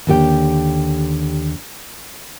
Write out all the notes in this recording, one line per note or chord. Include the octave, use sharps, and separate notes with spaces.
D#2 D3 G4 G5